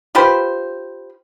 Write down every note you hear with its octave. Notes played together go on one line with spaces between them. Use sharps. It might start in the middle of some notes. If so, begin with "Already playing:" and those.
F4 G4 B4 C5